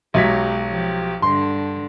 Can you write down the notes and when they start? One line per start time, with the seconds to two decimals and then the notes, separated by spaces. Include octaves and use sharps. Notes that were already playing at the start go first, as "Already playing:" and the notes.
0.14 B1 F#3 G#3 G4 B6
0.71 F3 G4
1.22 G2 D3 C6